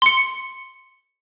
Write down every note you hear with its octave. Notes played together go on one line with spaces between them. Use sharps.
C6 C#7